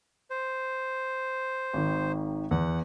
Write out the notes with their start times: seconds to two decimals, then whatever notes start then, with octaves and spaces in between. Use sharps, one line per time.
0.30 C5
1.73 G#1 D#3
2.51 E2 F#5